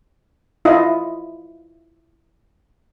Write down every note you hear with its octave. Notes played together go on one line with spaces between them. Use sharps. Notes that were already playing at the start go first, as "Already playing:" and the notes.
E4 F4 D#5